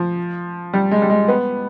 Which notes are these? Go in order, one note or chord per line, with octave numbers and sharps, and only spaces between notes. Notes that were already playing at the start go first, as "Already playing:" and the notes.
Already playing: F3
G3
G#3
G3
G#3
B3